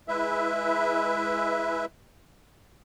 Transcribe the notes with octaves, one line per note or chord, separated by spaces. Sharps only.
G#3 E4 B4 E5